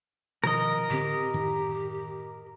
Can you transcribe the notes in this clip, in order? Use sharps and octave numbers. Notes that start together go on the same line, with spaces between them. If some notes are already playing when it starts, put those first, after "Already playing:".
B2 D#3 F3 A#4 D#5
A2 D3 C4 G4
F#2 A2 D#3